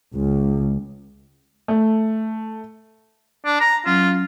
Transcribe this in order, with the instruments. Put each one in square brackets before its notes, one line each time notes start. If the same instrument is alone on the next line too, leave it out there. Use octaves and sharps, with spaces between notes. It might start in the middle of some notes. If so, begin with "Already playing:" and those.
[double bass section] C#2
[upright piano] A3
[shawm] D4
A#5
[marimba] F#3 C#4 [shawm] F4